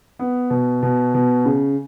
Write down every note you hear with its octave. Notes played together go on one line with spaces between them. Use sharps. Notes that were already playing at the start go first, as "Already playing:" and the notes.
B3
B2
B2
B2
C#3